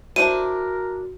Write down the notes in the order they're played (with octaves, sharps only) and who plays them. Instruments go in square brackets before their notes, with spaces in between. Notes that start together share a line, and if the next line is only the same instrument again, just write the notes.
[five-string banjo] D4 E4 C5 [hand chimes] F#4 [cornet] A#4 [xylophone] D#7